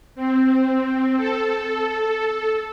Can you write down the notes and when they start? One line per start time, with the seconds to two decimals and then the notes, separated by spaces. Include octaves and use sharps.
0.15 C4
1.17 A4